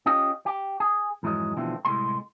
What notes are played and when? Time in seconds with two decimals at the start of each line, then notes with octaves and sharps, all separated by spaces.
0.06 C#4 F4 G4 D#5
0.46 G4
0.80 G#4
1.23 F2 G#2 E3 F#3 G#3
1.57 B2 D3 E3 F3 A3 C4
1.85 C2 A2 C3 G#3 C6